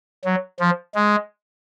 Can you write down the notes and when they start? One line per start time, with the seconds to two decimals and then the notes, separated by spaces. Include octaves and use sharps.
0.25 F#3
0.60 F3
0.95 G#3